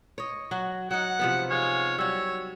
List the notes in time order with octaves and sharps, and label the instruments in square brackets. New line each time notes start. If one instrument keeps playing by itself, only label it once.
[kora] C#5 D#5
F#3 F#4
[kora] F#3 D#4 [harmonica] F#5
[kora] C3 F3 B3
[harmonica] G#3 F4 C#5
[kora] F#3 G3 [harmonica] C#5 E6